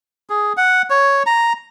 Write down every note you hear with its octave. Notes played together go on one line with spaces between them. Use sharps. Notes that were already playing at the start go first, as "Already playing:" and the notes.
G#4
F#5
C#5
A#5